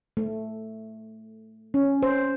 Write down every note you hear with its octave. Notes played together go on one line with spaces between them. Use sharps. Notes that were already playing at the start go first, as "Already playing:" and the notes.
A3
C#4
C5